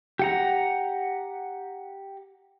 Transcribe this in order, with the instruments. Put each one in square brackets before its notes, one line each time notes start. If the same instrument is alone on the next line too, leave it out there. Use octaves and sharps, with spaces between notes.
[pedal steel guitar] G4 F#5 A#5